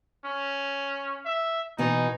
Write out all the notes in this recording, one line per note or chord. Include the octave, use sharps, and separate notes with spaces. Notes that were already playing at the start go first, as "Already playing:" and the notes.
C#4
E5
B2 E3 D#4